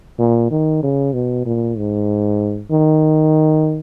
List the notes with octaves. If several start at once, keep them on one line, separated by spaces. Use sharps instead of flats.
A#2
D#3
C#3
B2
A#2
G#2
D#3